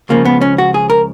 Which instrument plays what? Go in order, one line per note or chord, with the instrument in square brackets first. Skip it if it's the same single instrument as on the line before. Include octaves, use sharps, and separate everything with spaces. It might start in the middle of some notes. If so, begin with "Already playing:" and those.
[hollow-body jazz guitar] C#2 C#3 F3 A#3
B3
C#4
F#4
G#4
A#4